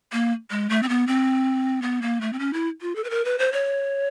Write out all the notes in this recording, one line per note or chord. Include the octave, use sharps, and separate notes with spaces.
A#3
G#3
A3
C4
B3
C4
B3
A#3
A3
C4
C#4
E4
F4
A4
B4
A#4
B4
C5
C#5